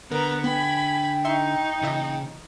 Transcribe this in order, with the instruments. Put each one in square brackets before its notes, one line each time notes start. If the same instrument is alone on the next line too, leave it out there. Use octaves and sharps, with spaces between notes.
[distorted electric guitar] D3 [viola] B3 A#5 [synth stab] A#4 [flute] B4
[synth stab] B3 [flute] G5 [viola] G#5 B5
[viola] D#4 [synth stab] E5 C6 C#6
[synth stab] A#2 E3 D#5 [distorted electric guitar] C#3